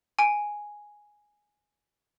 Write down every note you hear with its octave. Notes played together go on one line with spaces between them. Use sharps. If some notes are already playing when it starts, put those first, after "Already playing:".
G#5 D7